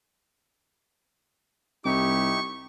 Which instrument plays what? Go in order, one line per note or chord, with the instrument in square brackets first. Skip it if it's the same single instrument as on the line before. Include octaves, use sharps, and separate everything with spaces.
[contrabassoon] C2 [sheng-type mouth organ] D#4 E4 G4 [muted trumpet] C#6